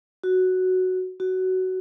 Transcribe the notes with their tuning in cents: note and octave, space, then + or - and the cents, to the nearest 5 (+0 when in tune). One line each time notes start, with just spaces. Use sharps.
F#4 +0
F#4 +15